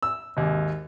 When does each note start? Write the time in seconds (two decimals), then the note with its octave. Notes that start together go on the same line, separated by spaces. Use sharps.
0.03 E6
0.37 G#1 D#2